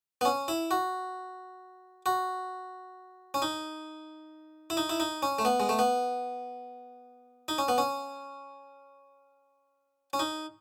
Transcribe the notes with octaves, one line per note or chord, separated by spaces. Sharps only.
B3
C#4
E4
F#4
F#4
C#4
D#4
E4
D#4
E4
D#4
C#4
A3
B3
G#3
A3
B3
D#4
C#4
B3
C#4
C#4
D#4